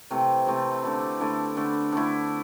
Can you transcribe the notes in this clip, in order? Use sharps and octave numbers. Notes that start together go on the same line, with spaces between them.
C3 E3 A3 C4
C3 E3 A3 C4
D3 A3 E4
D3 A3 E4
D3 A3 E4
D3 A3 E4